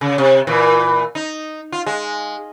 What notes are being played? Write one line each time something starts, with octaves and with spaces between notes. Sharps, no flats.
C#3
C3
A#2 E3
D#4
F4
G#3